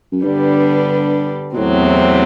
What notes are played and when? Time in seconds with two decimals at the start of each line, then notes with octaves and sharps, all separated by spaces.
0.12 F#2
0.24 G2 D3 G3 B3 D4
1.53 B2
1.57 E2 A2 C3 F#3 C4